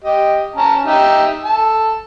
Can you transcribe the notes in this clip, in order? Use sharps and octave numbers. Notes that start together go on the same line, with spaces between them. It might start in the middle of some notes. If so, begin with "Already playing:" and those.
G4 D#5
C#4 A5 A#5
D#4 G4 E5
A4 A5